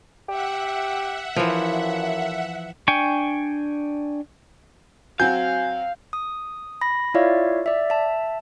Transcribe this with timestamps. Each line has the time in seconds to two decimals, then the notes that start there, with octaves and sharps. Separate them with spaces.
0.29 G4 E5 F#5
1.36 F#2 E3 F3
2.88 D4 G5 G#5 C#6
5.20 F#3 C4 F#4 F5 G#5 G6
6.13 D#6
6.81 B5 A#6
7.14 E4 F4 C#5 D5 E5 F5
7.66 D5 E5
7.90 E5 A5